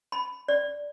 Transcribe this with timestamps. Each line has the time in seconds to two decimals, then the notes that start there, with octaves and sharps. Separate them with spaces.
0.12 B5
0.48 D5